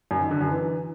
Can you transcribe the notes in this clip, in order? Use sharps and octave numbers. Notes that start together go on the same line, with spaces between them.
F#2
D#3
D3
F#2
E3